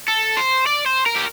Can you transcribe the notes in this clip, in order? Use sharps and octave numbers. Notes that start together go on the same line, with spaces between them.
A4
C5
D5
C5
A#4
G4